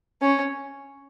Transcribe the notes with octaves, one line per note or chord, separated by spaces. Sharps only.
C#4